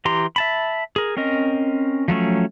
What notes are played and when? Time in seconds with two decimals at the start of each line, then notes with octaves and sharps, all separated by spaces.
0.05 E3 G4 A#5 C6
0.36 E5 A5 B5
0.96 G#4 A#4
1.17 C4 C#4 A#4 D#5
2.08 F3 F#3 A3 C#4